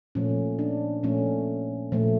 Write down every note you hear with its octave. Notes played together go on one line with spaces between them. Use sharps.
A#2 F3 A3 C#4
D4
A#2 F3 A3 C#4
A#2 F3 A3